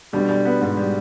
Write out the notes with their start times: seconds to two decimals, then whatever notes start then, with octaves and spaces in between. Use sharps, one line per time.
0.13 B2 D3 G3
0.29 G3
0.45 B3
0.61 G#2 B3
0.77 G3